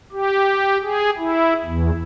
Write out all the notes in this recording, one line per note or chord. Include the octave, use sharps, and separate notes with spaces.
G4
G#4
E4
E2